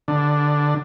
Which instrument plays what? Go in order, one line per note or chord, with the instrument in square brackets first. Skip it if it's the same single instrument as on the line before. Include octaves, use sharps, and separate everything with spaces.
[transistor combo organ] D3